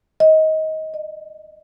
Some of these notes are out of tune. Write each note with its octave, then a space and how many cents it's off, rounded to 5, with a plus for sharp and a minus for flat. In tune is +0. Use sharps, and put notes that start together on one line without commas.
D#5 +20
D#5 -45